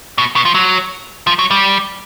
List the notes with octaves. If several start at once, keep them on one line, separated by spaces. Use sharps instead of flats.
B2
B2
F3
F#3
F3
F#3
G3